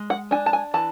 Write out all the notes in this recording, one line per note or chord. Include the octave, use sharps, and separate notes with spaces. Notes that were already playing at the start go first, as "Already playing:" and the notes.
Already playing: G#3
F#5
D4 G#5
A5
G#5
E3 A5